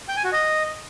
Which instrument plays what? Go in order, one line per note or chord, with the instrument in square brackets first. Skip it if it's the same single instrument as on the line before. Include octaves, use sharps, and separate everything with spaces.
[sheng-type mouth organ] G5
G#5
F#4
D#5